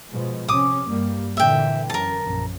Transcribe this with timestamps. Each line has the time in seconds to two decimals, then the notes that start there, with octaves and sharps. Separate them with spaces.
0.11 B2 F3 G#3
0.48 C3 C#4 D6 D#6
0.89 G2 G3 A#3
1.37 A#2 D3 E3 E5 G5
1.90 F#2 A#4 A5
2.23 A#1 F#2